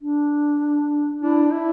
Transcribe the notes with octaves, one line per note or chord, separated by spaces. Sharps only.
D4
D4 E4
E4